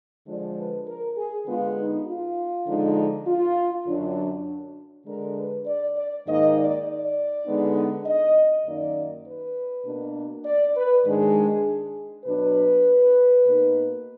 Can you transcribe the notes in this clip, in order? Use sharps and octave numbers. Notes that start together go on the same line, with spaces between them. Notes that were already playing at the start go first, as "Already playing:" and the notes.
D3 F3 G#3 D4 D5
B4
A#4
G#4
D3 G#3 B3 F4
D#4
F4
D3 F3 G#3 D#4
F4
F#2 D3 F#3 D4
D3 G#3 D4 A#4
B4
D5
D5
G#2 D#3 A#3 D#4 D#5
D5
D5
D3 G#3 B3 D#4
D#5
F#2 D#3 A#3 D#4 D5
B4
B2 A#3 D4
D5
B4
G#2 D#3 G#3 D4 G#4
B2 F#3 D4 B4
B2 A#3 D#4